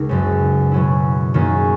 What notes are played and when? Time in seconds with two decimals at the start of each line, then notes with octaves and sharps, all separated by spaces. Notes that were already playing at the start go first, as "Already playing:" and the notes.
Already playing: C#2 D#4 A#4
0.09 F#1 F#2 C#3
0.72 B2 F#3 C#4 E4
1.34 F#2 D#3 A#3 C#4 G#4